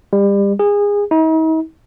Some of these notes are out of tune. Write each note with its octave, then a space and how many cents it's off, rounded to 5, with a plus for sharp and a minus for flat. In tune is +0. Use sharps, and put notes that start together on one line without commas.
G3 +30
G#4 -25
D#4 +45